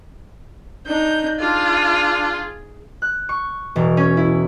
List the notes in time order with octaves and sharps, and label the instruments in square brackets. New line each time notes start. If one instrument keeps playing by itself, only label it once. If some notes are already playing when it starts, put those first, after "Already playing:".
[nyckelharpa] D4 D#4 [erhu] G6
[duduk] D4 [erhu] F4 [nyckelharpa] G#4
[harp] F#6
C#6
E1
C#4
E4